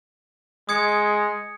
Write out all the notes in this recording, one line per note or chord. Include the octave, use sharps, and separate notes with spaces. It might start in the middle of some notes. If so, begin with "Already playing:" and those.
G#3 D#6 G#6 C#7